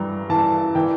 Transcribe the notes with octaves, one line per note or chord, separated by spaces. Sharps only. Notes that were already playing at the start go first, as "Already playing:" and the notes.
Already playing: G2 E3 G3 A#5
E3 A5
E3 G5